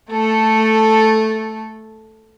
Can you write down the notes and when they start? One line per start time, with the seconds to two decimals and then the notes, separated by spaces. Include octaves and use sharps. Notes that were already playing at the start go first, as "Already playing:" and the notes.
0.11 A3 A4